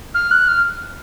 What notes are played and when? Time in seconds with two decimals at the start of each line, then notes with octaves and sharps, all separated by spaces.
0.15 F6
0.31 F#6
0.48 F6